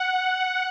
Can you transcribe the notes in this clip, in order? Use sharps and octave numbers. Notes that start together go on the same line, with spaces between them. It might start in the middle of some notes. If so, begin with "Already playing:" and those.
Already playing: F#5